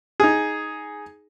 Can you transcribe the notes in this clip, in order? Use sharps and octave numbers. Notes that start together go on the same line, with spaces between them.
D#4 G#4